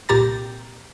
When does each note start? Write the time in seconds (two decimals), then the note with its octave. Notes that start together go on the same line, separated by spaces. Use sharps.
0.09 C2 A#2 G4 A#5 A6